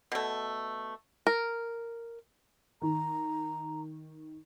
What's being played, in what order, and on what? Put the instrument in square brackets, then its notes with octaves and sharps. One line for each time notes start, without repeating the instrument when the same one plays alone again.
[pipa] B2 A3
[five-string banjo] A#4
[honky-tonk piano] D#3 [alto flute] A#5